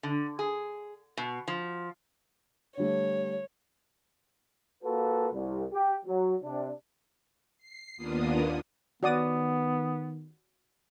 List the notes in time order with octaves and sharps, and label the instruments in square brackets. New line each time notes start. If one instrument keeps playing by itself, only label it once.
[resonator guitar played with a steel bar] D3
G#4
B2
F3
[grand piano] D3 G3 A3 [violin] C#5
[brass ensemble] A#3 F4 F#4 A4 B4
C2
G4
F#3
C3 D4
[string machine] C7
D#2 A#3 B3 D4 F4 D#6
[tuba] D#3 [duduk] B3 [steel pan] F#4 D5 D#6